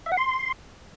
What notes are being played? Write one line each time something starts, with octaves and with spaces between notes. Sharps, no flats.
E5
F#5
C6